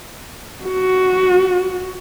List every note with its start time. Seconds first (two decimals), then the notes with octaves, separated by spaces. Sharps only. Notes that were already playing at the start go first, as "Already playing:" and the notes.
0.64 F#4